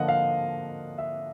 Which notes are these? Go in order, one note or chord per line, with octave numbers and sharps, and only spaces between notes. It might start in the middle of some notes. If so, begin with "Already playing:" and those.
Already playing: D3 F3 A#3 D4 D#5 F#5
F5
E5